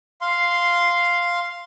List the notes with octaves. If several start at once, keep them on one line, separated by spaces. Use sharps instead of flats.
F5 C6